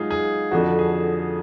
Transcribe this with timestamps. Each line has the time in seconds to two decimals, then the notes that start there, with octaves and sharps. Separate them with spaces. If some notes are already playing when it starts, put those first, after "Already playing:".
Already playing: G#2 F#3 D#4 F4 G#4
0.11 G#4
0.51 F2 D3 F3 F#4
0.79 G#4